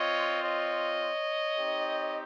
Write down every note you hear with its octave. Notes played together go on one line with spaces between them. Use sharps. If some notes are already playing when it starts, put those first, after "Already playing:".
Already playing: C4 F4 C#5 D#5
C#5 D#5
C4 D#4 G4